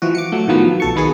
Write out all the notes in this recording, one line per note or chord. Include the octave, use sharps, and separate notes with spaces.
E3 F3 F#4
D6 C#7
F#3 A3
A2 D#3 F3 F#3 B3
B1 A4 C#6
D#3 B3 F#4 G#4